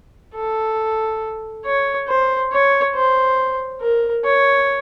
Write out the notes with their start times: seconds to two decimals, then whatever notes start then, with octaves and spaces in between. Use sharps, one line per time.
0.35 A4
1.66 C#5
2.08 C5
2.52 C#5
2.95 C5
3.81 A#4
4.25 C#5